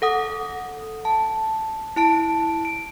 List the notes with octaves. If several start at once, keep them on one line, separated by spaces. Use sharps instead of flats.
A4 F#5 D#6
A5
E4 A5 D7
D7